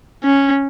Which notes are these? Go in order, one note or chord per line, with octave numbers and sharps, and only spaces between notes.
C#4